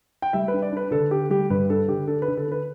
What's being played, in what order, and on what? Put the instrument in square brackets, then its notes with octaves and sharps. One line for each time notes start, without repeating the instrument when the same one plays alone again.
[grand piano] G5
G3 E5
B4
D4
D5
D4 B4
D3 A4
D3 G4
G3 G4
G2 B4
D4 A4
D3 G4
D4 A4
B4
D3
A4
D4 B4